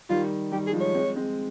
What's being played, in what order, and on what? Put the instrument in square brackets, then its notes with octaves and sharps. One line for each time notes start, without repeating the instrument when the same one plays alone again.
[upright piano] D#3 G3 [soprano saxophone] F4
[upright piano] D#3 G3 [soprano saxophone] G4
[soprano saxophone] G#4
[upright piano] F3 G#3
[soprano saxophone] C#5
[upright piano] G#3 C4
G#3 C4